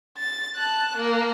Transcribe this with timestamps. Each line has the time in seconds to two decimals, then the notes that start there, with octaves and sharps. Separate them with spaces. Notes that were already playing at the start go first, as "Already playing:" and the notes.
0.18 A6
0.56 A5 F#6
0.97 A#3